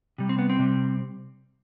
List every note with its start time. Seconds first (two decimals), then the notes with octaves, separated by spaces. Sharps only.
0.18 C3 G3
0.29 C4
0.39 B3
0.50 C4
0.59 C3 G3